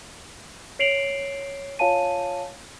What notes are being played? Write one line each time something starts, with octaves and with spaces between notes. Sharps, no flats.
C#5 C7 D7 F7 F#7
F4 C#5 F5 G#5 A5 D#7